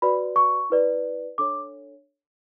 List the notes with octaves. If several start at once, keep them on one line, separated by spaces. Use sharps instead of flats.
F#4 B4 D5 B5
C#6
E4 B4 D5
D4 A4 C#5 D6